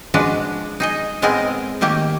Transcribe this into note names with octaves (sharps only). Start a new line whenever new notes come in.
F3 G#3 D4 F#4 B4
D#4 G#4 D#5
A2 G#3 B3 C4 G#4 A#4
D#3 A3 A#3 G4